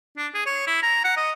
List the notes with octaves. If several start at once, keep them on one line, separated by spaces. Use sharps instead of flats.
D4
G#4
C#5
E4
A#5
F#5
D#5